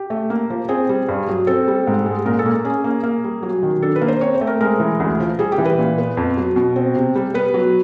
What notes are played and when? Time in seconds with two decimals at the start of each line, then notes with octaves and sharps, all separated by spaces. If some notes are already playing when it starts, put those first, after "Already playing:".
Already playing: G4
0.10 A3
0.30 A#3
0.50 F3
0.69 C4 G#4
0.89 G3
1.09 G2
1.28 F#3
1.47 C4 A4
1.68 G3
1.87 G#2
2.06 G#3
2.25 A#2 A#4
2.39 A4
2.46 A#3
2.65 C#4 G#4
2.84 A#3
3.04 A#3
3.24 G3
3.43 F#3
3.63 D#3
3.82 D4 A4
3.96 B4
4.01 A#3
4.08 C5
4.21 C4 C#5
4.34 C5
4.41 A3
4.47 A#4
4.61 G#3 A#4
4.80 E3
5.00 D2
5.20 F3
5.39 G3 G#4
5.52 G4
5.58 E3
5.65 B4
5.79 A#2
5.98 B3
6.17 F2
6.37 F#3
6.56 B2
6.76 C4
6.96 C3
7.16 G3
7.34 B3 B4
7.54 F#3